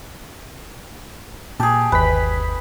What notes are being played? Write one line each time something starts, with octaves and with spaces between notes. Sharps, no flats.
A#2 G4 G#4 A5
G1 D#2 B4 B6